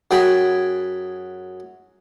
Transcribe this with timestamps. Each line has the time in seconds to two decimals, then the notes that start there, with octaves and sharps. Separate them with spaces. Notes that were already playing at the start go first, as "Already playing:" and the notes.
0.11 F#2 G#4 G5 G#5 B5